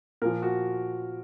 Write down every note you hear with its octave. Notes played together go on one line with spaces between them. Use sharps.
A#2 F3 A#4
F#4